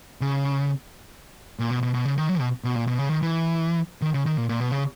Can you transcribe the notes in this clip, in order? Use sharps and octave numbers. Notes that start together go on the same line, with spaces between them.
C#3
A#2
B2
B2
B2
C#3
D#3
F#3
B2
B2
A#2
B2
C#3
D#3
E3
D#3
C#3
D#3
A#2
A#2
B2
C#3